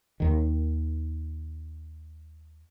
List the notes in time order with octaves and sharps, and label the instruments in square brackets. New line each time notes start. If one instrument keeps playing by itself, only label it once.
[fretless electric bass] D#2 D#3